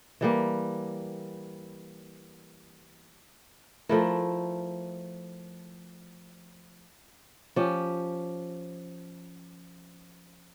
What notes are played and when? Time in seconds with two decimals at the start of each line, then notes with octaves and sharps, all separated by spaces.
0.21 E3 G3 A#3
3.89 F3 A3 E4 A#4
7.56 F3 C#4 G4